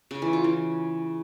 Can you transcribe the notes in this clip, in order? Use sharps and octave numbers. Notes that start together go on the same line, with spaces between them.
C#3
E3
F4
E3